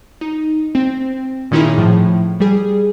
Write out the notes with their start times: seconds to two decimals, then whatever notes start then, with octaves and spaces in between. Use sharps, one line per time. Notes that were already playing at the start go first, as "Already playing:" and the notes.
0.21 D#4
0.75 C4
1.51 A#2 D#3 C#4 D#4 E4 G#4
1.78 A2 F3
2.40 G3 G#4